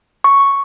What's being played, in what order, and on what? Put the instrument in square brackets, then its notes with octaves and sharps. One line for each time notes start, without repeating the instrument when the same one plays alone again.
[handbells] C#6